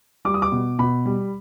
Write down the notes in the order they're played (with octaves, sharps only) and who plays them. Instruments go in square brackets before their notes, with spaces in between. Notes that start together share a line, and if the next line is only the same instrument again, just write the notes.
[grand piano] G3 D6
D#6
D6
B2
B2 B5
G3